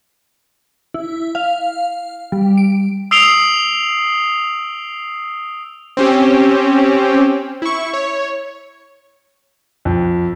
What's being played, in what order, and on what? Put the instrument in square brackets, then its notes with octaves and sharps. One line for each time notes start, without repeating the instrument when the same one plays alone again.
[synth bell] E4
F5
G3
D7
[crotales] D#6 E6 C7 D7 F7 G7
[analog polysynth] C4 C#4 G4
E4 C#6
C#5
[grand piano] F2